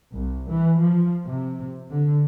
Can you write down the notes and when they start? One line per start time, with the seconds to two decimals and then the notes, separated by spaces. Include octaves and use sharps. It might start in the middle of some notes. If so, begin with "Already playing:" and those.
0.13 C2
0.49 E3
0.79 F3
1.25 C3
1.90 D3